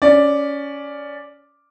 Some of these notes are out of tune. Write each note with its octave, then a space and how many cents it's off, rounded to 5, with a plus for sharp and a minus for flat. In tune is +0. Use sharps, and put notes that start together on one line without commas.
C#4 +15 D5 +0